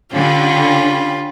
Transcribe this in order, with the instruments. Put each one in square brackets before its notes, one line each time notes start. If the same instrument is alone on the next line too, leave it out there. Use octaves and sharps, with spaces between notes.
[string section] D3 [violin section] C#4 G4 B5 [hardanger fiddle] F4